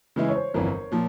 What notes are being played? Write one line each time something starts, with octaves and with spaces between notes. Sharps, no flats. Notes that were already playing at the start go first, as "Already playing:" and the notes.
C#3 E3 G#3 E4
C#5
C5
G1 F2 E3 A#4
A#2 F3